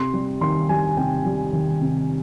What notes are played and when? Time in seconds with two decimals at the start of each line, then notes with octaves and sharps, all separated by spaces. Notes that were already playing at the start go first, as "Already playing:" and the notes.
Already playing: C3 C6
0.14 G3
0.41 D#3 C6
0.69 G3 G#5
0.97 C3 G5
1.25 G3
1.53 D#3
1.81 C3